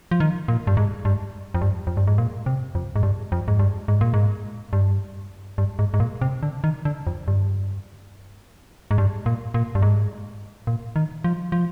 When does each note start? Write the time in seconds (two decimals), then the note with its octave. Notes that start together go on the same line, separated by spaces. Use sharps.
0.11 F3
0.20 D#3
0.48 A#2
0.67 G2
0.77 G#2
1.05 G2
1.54 F2
1.61 G2
1.87 F2
1.97 G2
2.07 G#2
2.18 A#2
2.46 C3
2.75 F2
2.96 G#2
3.03 G2
3.32 F2
3.48 G#2
3.59 G2
3.88 G#2
4.01 A#2
4.14 G#2
4.73 G2
5.58 G2
5.79 G#2
5.94 G#2
6.00 A#2
6.21 C3
6.43 D3
6.64 D#3
6.85 D3
7.07 F2
7.28 G2
8.91 G#2
8.98 G2
9.26 A#2
9.54 A#2
9.75 G2
9.82 G#2
10.67 A#2
10.96 D#3
11.24 F3
11.52 F3